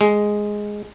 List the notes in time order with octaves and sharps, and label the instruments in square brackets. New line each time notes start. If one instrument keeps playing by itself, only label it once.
[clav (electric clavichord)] G#3